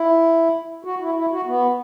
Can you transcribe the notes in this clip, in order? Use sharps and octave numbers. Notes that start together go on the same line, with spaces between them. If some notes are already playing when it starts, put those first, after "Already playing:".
Already playing: E4
F#4
E4
E4
F#4
B3